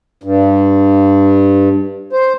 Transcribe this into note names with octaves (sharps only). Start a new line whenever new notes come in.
G2
C5